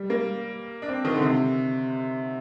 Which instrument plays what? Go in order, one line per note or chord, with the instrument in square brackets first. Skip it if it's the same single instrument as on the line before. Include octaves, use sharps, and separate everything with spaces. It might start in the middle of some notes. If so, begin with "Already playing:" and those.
Already playing: [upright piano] G3
A#3
D4
C4
D#3
D3
C3